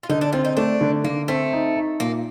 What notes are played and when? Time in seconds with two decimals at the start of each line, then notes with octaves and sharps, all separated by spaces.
0.03 F4
0.09 D3 D#4
0.21 D4
0.33 C4 F4
0.45 D#4
0.57 A3 D4
0.81 D3
1.04 D3 A#3
1.28 A3 C4
1.53 D#4
1.76 D#4
2.00 A#2 A#3